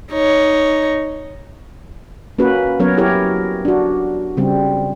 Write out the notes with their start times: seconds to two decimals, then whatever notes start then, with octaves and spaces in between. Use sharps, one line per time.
0.12 D#4 C#5
2.38 A#3 C#4 F#4 B4
2.80 F#3 B3 C#4 A#4 C#5
2.97 E4 G4 A#4 C#5
3.65 D4 F#4
4.37 C#3 G3 C4